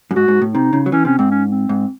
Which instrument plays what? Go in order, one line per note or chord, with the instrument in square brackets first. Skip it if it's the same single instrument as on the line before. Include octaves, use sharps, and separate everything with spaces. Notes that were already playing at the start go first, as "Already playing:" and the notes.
[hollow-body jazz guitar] F#2
[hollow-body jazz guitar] G#2 [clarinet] F#4
[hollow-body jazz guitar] G#2
A2
[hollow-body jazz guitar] C3 [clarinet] D#4
[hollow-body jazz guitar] C#3
F#3
[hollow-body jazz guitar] E3 [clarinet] C#4
[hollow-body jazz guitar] C3 [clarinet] C#4
[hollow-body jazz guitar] G#2 [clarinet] C4
[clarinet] C#4
C4
[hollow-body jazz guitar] G#2